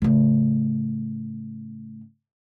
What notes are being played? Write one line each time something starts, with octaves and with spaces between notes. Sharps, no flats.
A2 C#3